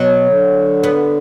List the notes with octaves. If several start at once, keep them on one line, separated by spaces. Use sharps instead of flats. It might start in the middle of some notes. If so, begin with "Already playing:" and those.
Already playing: B2 F#3
D3
B3